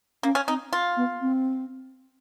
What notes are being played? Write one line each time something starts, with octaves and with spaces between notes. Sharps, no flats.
A#3 C#4
C#4
C4 D#4
F4
B3
C4